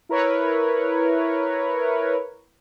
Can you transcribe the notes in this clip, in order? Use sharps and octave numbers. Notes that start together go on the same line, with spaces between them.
E4 A#4 B4 C#5